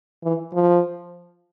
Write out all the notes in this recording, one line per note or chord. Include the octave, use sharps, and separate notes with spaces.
E3
F3